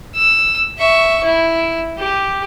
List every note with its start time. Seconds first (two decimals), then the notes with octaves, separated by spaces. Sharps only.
0.15 E6
0.78 E5 C#6
1.24 E4
1.99 G4